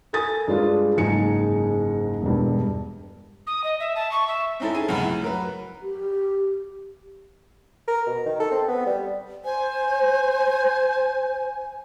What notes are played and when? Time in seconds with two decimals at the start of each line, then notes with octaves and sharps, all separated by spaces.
0.13 A4 A#4 G#5 D#6 A6
0.48 G2 G#3 D4 F4
0.97 F#1 G#2 G#3 D#4 G#5 C#7
2.22 E1 G2
3.47 D#6
3.64 D#5
3.80 E5
3.95 A5
4.11 C#6
4.28 E5
4.60 C4 C#4 D#4 E4 A4
4.74 G#4 D#7
4.87 C#2 F#2 B3
5.02 A2
5.22 F#3 A#4 B4
5.82 G4
7.88 A#4
8.07 B2
8.26 D#3
8.40 A4
8.52 C4
8.68 B3
8.86 G3
9.45 C5 G#5